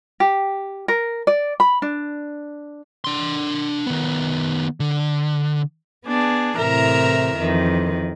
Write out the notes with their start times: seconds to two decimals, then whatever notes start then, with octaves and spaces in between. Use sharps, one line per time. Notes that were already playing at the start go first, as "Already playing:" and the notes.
0.20 G4
0.88 A#4
1.27 D5
1.60 B5
1.82 D4
3.04 D4 C6
3.86 D#3 B3
4.80 D3
6.06 B3 D4 G#4
6.58 A2 C3 E3 A#4 E5 A#5
7.37 F2 D#3 E3